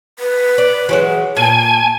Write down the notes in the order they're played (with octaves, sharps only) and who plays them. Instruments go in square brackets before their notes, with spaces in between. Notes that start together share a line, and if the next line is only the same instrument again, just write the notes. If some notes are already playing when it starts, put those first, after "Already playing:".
[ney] B4
[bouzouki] D5
E3 F#3 G#3
[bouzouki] A#2 [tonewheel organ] G#5 [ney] A5